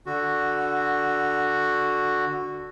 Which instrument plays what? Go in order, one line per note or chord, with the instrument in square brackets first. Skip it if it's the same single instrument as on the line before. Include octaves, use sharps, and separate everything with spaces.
[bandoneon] D3 F#4